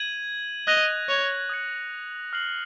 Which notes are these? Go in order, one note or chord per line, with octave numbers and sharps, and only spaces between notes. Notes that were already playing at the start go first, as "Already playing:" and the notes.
Already playing: G#6 D#7 F#7
D#5 F#6 A#6 F7
C#5
D#6 G#6 C#7
F6 C7 F#7